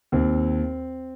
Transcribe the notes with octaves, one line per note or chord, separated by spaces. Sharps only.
D#2 C4